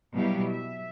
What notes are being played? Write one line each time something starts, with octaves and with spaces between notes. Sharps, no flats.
B2 F#3 G3 E4 G4 F5
E5